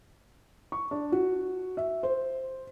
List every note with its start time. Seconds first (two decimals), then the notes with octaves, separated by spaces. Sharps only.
0.72 C#6
0.91 D4
1.12 F#4
1.77 E5
2.03 C5